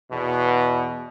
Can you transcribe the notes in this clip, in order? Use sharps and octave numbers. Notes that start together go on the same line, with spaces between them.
E2 B2